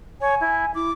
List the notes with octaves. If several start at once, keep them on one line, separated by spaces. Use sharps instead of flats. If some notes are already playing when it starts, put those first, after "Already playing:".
C#5 G#5
E4
E4 D6